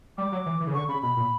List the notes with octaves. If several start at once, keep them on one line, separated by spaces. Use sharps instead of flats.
G3 D6
F#3
E3
E3
C#3
D3 C#6
C#3 B5
B2 B5
A#2